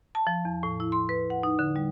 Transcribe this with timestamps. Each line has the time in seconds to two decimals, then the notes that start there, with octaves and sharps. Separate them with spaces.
0.15 A5
0.27 F3
0.45 E2
0.63 A2
0.80 E4
0.92 C6
1.09 B4
1.30 F#5
1.43 D#4
1.59 D3
1.76 G3